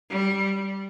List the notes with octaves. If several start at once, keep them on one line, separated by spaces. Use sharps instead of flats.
G3